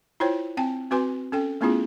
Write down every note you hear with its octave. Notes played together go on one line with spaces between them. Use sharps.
E4 F4 C5 C#5 G5
C4 G5 A5
C4 F#4 B4 G#5 C6
C#4 A4 G5
A3 B3 C#4 E4 F4 G#4